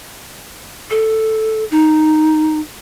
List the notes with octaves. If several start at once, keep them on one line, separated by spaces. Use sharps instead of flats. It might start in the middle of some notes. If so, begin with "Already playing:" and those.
A4
D#4